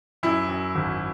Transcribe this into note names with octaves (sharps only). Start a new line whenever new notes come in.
F#2 E4
F#2
G#1